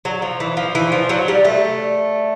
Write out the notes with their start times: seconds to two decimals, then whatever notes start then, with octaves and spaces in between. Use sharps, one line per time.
0.05 F#3
0.22 F3
0.40 E3
0.57 F3
0.75 E3
0.92 F3
1.09 F#3
1.28 G3
1.45 A3